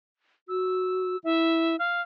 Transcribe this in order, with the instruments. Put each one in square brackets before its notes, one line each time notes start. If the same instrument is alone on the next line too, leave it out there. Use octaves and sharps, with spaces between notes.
[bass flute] F#4 [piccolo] E6
[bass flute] E4 [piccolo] E5
[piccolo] F5